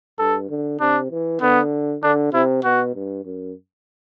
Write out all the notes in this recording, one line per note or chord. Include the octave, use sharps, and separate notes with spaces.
G2 A4
D3
C3 D4
E3
D3 B3
D3 D4
C3 E4
B2 F#4
G2
F#2